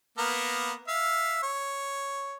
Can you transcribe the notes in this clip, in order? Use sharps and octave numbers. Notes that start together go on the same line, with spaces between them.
A#3 B3 A#4
E5 F5
C#5